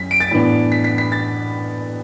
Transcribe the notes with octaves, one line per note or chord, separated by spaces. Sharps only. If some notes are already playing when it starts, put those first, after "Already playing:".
Already playing: F#2 B6
D7
A6
A2 E3 B3 D4
B6
B6
B6
A6